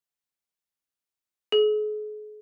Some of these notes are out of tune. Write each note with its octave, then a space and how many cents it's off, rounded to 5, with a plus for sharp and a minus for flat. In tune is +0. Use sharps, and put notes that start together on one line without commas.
G#4 +40